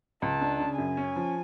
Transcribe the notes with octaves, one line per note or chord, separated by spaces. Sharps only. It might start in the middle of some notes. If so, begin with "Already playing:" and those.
C#2 A5
D4
C#3
F#2 G#5
C#4
F3